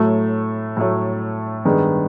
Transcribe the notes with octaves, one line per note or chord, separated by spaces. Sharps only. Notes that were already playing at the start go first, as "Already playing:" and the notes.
Already playing: A2 F#3 A3
A2 F#3 A3
G2 D#3 G#3 B3 D4